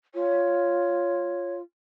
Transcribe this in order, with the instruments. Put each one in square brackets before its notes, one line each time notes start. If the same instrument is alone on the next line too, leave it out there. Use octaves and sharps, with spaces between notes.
[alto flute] F4 [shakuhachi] C#5